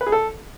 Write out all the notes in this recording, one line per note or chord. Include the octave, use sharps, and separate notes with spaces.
B4
G#4
A4